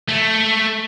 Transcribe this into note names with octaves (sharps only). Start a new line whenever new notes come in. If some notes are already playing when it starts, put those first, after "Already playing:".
A3